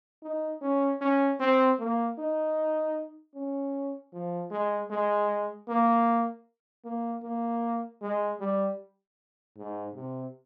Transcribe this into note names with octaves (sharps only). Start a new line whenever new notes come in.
D#4
C#4
C#4
C4
A#3
D#4
C#4
F3
G#3
G#3
A#3
A#3
A#3
G#3
G3
G#2
C3